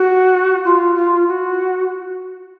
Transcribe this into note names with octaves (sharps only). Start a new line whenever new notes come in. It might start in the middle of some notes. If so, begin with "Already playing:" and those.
Already playing: F#4
F4
F4
F#4